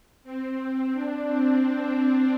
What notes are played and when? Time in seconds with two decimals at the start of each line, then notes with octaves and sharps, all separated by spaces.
0.24 C4
0.93 D4
1.26 C4